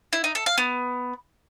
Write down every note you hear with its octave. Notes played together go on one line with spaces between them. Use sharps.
E4
D#4
A4
F5
B3